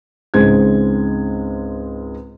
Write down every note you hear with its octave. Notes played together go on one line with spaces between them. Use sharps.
C#2 G#2 G#3 C4 C5 G#6